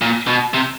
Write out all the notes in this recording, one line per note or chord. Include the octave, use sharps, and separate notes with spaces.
A#2
B2
C3